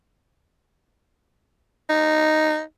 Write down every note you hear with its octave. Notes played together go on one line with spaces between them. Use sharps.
D#4